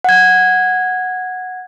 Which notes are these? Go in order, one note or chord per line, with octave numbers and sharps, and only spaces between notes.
F#5 G#6